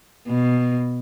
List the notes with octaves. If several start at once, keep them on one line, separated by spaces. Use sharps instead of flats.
B2